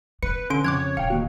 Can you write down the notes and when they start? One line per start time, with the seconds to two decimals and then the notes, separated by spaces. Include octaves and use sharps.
0.23 B3 B4 C#7
0.50 D3 C#4 C6 D7
0.65 F2 C#3 C#5 D6 F#6 G#6
0.97 D1 F5 G5 C#7
1.10 D#3 A#3 F#4